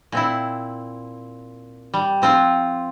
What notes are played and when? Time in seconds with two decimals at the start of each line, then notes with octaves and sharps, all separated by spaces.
0.12 A#2 C4 E4
1.94 G3
2.22 F3 C4 F4